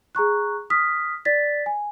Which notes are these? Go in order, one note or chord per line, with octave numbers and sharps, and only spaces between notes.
G#4 A#5 C#6 F#6
D#6 F6 B6
D5 A6 B6
G#5